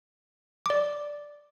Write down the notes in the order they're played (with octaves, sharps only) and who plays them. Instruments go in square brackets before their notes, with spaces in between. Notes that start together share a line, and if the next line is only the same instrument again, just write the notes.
[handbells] D5 D6